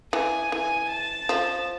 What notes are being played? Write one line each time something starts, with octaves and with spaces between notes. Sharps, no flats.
E3 G#5
E3 G#5
A5
F3